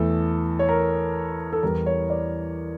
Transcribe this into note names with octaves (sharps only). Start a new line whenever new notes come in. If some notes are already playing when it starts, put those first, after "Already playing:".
Already playing: E2 E3 A3 A4
C#5
A#4
A4
E2 E3 G3 A#4
C#5
D5